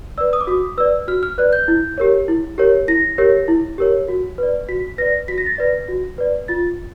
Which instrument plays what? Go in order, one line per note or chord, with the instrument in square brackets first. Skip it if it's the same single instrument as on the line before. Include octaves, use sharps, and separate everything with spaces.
[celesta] B4 D5 E6
D#6
D6
F#4 D#6
B4 D5 E6
F#4 F6
F6
B4 D5 F#6
G6
E4
G4 A#4 C#5
E4
G4 A#4 C#5
E4 A#6
G4 A#4 C#5
E4
G4 A#4 C#5
F#4
B4 D5
F#4 B6
B4 D5 A#6
F#4 B6
A#6
A6
B4 D5 A#6
F#4
B4 D5
F4 A6